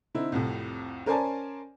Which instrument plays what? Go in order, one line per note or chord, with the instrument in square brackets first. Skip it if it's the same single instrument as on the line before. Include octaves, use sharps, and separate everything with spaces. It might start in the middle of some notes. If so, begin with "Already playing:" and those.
[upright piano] D3 C4 D#4 E4
C2 F2 A2
C#4 A#4 C5 D5 G#5 A5